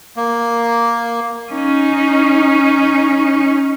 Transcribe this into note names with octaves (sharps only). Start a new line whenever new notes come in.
A#3
C#4 D#4